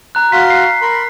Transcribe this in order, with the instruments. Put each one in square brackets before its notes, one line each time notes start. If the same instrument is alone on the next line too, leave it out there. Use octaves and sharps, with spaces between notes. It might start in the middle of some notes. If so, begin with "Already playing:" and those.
[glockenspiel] A#5 F#6
[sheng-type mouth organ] F#4 F5 C6 [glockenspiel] B6
[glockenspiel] C7
[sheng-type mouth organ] A#4 B5 C6